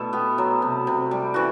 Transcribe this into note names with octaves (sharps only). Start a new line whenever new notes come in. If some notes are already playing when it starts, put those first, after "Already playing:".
Already playing: B2 A3 E4 A4 B4 D5 E5
B3 G4
F#3
C3
C3
G3 G4
E3 F#4